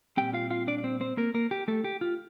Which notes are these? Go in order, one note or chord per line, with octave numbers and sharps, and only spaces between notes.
A#2 G3 C4 G4 G5
F4 F5
F4 F5
D4 D5
D5
C4 C5
C4 C5
A#3 A#4
A#3 A#4
G4
A3 A4
G4
F4